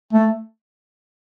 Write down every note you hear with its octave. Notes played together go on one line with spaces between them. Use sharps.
A3